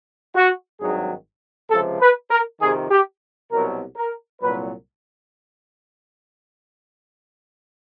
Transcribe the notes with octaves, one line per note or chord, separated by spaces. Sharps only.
F#4
G#1 G2 D#3 F#3 G#4
C#2 C3 F3 A4
B4
A#4
F2 C3 D#3 G#4
G4
C2 B2 F#3 A#4
A#4
C2 A#2 F#3 B4